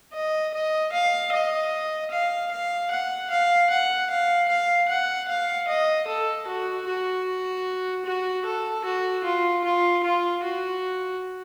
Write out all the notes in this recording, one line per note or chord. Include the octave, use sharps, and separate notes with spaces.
D#5
D#5
F5
D#5
F5
F5
F#5
F5
F#5
F5
F5
F#5
F5
D#5
A4
F#4
F#4
F#4
A4
F#4
F4
F4
F4
F#4